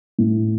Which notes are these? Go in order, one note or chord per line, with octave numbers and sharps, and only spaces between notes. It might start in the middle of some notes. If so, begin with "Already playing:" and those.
A2